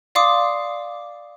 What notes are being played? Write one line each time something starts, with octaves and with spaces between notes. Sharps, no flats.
D5 F5 C6 D6 D#6